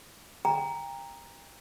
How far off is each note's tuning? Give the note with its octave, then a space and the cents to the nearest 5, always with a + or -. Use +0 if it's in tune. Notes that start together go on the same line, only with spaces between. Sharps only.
G5 +30 A#5 +0